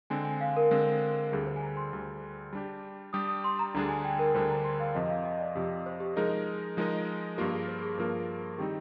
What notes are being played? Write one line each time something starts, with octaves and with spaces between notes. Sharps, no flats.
D3 G#3 C4 G#5
G#5
F5
A#4
D3 G#3 C4
D2 D3 G3 G#4
C5
G#5
A#5
C6
D2 D3 G3
G3 D4 G4
G3 D4 G4 D#6
D#6
C6
A#5
D2 D3 G3 D4 G#4 A#5
G#5
G5
A#4
D2 D3 G3 D4 G#4 C5
A#5
C6
F5
F2 C3 F3 D#5
F5
D#5
D5
F2 C3 F3 G4
C5
G4
F3 G#3 D#4 G#4 A#4 D#5
F3 G#3 D#4 A#4 D#5
G2 F3 A#3 F4 G4 A#4
G#4
C5
G#4
G2 F3 A#3 F4 A#4
D#3 G3 C4 D#4 G4